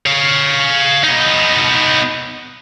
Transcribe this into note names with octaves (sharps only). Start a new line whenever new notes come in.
C#5 F5
B3 D#4